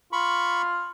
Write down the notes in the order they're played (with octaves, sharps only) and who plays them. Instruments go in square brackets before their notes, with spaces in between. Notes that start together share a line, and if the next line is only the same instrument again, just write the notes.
[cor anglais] F4 [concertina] B5 C#6